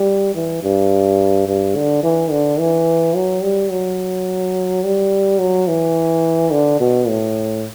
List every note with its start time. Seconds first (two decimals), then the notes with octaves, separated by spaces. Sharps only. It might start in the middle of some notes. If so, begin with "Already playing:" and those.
Already playing: G3
0.35 E3
0.63 G2
1.48 G2
1.76 D3
2.03 E3
2.31 D3
2.59 E3
3.16 F#3
3.43 G3
3.71 F#3
4.83 G3
5.40 F#3
5.68 E3
6.51 D3
6.80 B2
7.08 A2